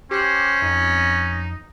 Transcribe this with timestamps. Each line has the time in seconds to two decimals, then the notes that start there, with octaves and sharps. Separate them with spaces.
0.11 C#4 G4 C5 F#6
0.62 F2 D#4